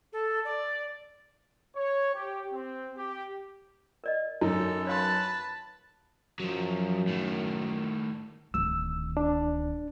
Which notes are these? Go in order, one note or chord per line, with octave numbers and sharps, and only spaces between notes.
A4
D5
C#5
G4
C4
G4
A#4 D5 D#5
F#2 D#4 A4
B4 C#5 F5 A5 C6
F#2 F3 F#3
A2 D#3
D1 D#3 E6
D4